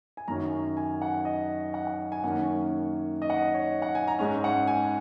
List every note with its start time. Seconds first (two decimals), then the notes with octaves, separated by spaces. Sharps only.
0.17 G#5
0.28 F#2 D#3 F#3 C#4 A#5
0.77 G#5
1.02 F#5
1.25 D#5
1.74 F#5
1.87 F#5
2.12 G#5
2.24 F#2 D#3 A#3 C#4 F#5
3.22 D#5
3.30 F#5
3.37 D#5
3.54 C#5
3.82 F#5
3.95 G#5
4.07 A#5
4.19 G#2 G#3 C#4
4.44 F#5
4.67 G#5